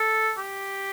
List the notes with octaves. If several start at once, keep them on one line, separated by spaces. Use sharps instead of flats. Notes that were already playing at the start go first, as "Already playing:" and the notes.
Already playing: A4
G4